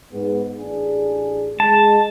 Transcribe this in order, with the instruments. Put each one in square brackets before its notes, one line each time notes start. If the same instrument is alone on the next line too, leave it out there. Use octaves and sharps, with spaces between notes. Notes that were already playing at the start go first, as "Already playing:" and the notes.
[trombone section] G#2 B3
A1 D4 G#4
[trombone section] G#3 [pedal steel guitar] A5